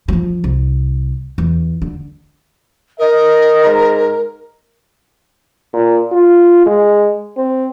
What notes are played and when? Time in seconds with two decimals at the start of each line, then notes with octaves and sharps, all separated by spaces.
0.08 F3 F#3
0.44 C2
1.38 E2
1.82 D3
2.99 A#4 D#5
3.65 G#2 A#5
5.73 A#2
6.12 F4
6.66 G#3
7.37 C4